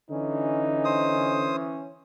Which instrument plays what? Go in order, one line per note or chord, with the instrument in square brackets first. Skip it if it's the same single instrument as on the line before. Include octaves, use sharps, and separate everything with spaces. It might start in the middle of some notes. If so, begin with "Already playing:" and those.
[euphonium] D3 [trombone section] E3 C#4 [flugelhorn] D#4
[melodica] C5 D#6